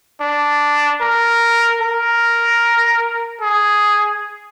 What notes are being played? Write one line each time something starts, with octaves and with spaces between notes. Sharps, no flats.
D4
A#4
A#4
G#4